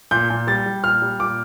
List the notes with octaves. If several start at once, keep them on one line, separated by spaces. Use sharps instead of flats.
A#2 G6
A#2
G3 A6
G3
A#2 F6
G3
A#2 D6